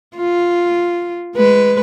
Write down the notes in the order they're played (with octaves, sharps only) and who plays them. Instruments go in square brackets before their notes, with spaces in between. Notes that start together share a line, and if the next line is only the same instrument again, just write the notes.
[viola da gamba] F4
G#3 B4